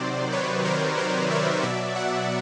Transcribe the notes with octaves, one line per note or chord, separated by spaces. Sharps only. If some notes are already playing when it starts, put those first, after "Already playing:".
Already playing: C3 D#3 F#3 C5 D5
B4 C#5
A#4 C5
A#4 C5
D5 E5
B2 F#3 D5 E5
E5 F#5